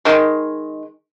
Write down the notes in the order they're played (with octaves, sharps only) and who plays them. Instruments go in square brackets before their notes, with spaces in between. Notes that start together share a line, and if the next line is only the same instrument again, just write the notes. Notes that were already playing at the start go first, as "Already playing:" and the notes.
[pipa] D#3 G#3